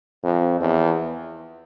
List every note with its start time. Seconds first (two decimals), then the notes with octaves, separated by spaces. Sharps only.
0.24 F2
0.61 E2